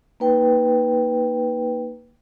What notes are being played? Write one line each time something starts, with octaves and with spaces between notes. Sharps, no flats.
A#3 D#4 B4 G5